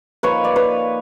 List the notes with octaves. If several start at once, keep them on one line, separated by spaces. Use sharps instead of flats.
F3 A#3 D#4 B4 C#5
D5
B4 C#5